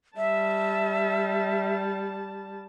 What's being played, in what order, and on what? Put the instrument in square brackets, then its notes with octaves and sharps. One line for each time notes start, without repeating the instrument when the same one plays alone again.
[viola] G3 A5 [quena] E5